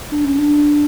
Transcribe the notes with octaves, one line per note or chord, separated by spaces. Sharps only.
D4
C#4
D4